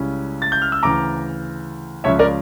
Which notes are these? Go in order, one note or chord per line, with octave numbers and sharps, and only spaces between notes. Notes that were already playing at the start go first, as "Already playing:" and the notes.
Already playing: C#2 C#3 G3 C#4 E4
A6
G6
F6
E6
D2 C#3 E3 A#5 D6
C#2 C#3 F3 C#4 C#5 E5
A#4 D5